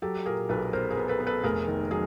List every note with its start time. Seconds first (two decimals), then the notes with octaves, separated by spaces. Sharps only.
0.02 F#3 G4 A4
0.26 A#2 G#4 A#4
0.49 B1 A4 B4
0.73 B3 A#4 C5
0.90 G#4 A#4
0.97 B3
1.08 A4 B4
1.20 B3
1.27 A4 B4
1.43 F1 G#4 A#4
1.68 D#3
1.91 F#3 G#4